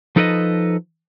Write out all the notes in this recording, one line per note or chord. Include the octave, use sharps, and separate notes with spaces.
F3 D#4 A4 B4 D5 D#5